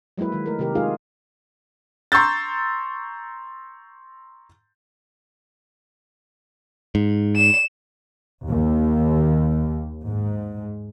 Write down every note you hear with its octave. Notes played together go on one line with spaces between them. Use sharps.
F#3 G#3 A#3 E4 B4
D#3 G#3
A3 A#4
C3 D#3 G4 A#4
G#3 D#4 F4 G#4 F5
A#5 C6 C#6 E6 G6 A6
G#2
E7
D#2
G#2